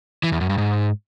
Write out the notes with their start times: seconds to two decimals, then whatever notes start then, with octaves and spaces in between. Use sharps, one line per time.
0.23 E3
0.32 E2
0.41 F#2
0.49 G2
0.58 G#2